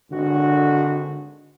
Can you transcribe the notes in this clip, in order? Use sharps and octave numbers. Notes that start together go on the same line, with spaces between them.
G#1 D3 F#4